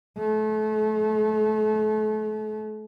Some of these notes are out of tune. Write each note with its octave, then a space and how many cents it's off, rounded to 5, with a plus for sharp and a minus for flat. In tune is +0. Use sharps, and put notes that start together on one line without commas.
A3 -35